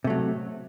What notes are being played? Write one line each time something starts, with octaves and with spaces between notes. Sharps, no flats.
C3 F#3 A3